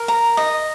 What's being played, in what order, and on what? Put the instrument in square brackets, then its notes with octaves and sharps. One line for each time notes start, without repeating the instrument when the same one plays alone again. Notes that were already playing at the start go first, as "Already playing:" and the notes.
Already playing: [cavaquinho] A#4
A#5
D#5